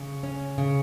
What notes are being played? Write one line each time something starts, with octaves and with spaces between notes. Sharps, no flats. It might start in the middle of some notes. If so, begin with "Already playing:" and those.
Already playing: C#3
C#4
C#3